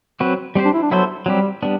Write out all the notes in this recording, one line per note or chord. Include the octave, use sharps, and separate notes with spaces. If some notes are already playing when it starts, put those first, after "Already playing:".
F#3 C4 F#4 B4
G3 C4 G4 C5
D4
E4
D4
F#3 B3 E4 A4 C5
F#3 G3 C4 G4
G3 B3 D4